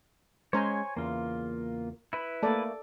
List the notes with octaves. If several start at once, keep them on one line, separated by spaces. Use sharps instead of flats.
G#3 C#4 C5 C#5 G#5 A#5
E2 C#3 A#3 F4
E4 B4
A3 A#3 A4 D5 A5